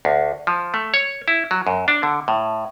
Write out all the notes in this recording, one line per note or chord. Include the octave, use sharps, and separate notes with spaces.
D2
F3
A3
C#5
E4
F#3
F#2
D4
D3
A2